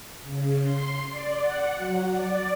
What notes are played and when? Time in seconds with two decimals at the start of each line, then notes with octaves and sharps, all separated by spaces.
0.23 C#3
0.62 C6
1.09 D5
1.39 F#5
1.76 F#3
2.08 D5